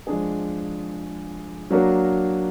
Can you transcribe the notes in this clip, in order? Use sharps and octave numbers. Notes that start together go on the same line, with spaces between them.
F3 G#3 D4 G#4
F#3 A#3 D4 F#4 A#4